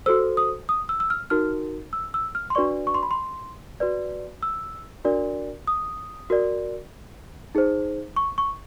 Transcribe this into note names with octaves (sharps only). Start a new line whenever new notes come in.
F#4 A4 C5 E6
D#6
D#6
E6
E6
F6
D#4 F#4 A#4 F6
E6
E6
F6
C6
D4 F#4 B4 D5 C#6
C#6
C6
B5
C6
F#4 B4 D5
E6
D4 F#4 A#4 D5
D#6
F#4 A#4 D5
D#4 G#4 C5
C#6
C#6